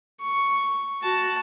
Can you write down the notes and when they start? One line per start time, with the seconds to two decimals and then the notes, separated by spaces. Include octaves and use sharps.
0.21 C#6
1.02 F#4 A5